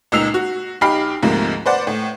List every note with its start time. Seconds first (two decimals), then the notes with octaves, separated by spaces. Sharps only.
0.12 C#2 A#2 D#4 E6 C7 F7
0.34 F#4
0.81 B1 D#4 G4 B5 F6 C7
1.22 D2 G#2 C3 F3 A#3
1.66 B4 C5 D5 F#5
1.87 A2